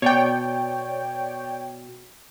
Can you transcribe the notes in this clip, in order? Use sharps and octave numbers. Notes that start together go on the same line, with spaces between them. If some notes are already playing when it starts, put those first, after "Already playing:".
B2 C#5 D5 G5